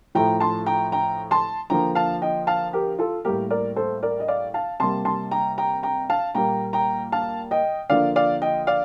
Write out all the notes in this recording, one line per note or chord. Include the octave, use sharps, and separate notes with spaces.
A2 F3 A3 G5 A#5
A5 C6
G5 A#5
G5 A#5
A5 C6
D3 F3 A#3 G5 A#5
F5 A5
D#5 G5
F5 A5
G4 A#4
F4 A4
A2 G3 A#3 G4 A#4
A#4 D5
A4 C5
A#4 D5
D#5
D5 F5
F5 A5
C3 G3 A#3 A5 C6
A5 C6
G5 A#5
G5 A#5
G5 A#5
F5 A5
A#2 G3 A#3 G5 A#5
G5 A#5
F5 A5
D#5 G5
D3 F3 A#3 D5 F5
D5 F5
D#5 G5
D5 F5